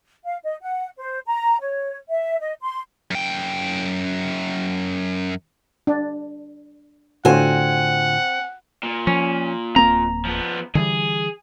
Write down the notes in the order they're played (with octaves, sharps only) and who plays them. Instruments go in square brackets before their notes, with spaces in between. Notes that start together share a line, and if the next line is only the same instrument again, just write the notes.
[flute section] F5
D#5
F#5
C5
A#5
C#5
E5
D#5
C6
[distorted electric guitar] F#2 G5
[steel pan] D4
[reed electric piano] A2 D3 F4 [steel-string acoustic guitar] C4 G#5 [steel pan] F#4 [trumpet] F#5
[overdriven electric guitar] A#2
[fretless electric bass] F3 [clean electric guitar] C#4
[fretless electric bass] D1 A#3 C4 [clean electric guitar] A#5
[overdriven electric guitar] F3 B3
[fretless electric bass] D3 E3 G3 [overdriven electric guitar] G#4